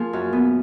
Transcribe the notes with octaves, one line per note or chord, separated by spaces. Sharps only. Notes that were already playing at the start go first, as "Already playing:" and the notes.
Already playing: F3 A#3 G#4
F#2
B3